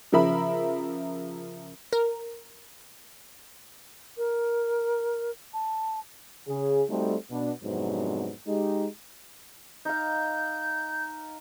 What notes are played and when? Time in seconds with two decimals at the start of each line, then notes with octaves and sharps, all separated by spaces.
0.12 C#3 F3 A#4 E5 B5
1.93 A#4
4.18 A#4
5.54 A5
6.48 C#3 G#4
6.89 G3 A3 C4 D#4 F#4 A4
7.30 B2 B3 D4
7.63 F2 G#2 C3 F#3 B3 D4
8.47 G#3 D#4 G4
9.85 D#4 F5 G6